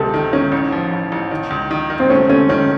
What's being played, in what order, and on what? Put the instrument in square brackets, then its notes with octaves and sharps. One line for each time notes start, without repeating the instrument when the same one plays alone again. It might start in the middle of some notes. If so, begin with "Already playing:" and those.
Already playing: [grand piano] C#2 C3 [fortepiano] A4
[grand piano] D#3
[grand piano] D#3 [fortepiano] C#4
[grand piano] A1
F3
A1
A1
D#3
C#2
D#3
D#3
[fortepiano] C4
[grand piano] A3 [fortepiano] C#4
[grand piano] A3 [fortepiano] C#4
[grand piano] D#3 [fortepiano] C#4